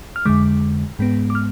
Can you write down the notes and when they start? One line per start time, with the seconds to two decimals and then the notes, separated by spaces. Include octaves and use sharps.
0.16 F6
0.26 F2 D3 G#3 D6
0.99 G#2 G#3 B3
1.30 D6
1.35 F6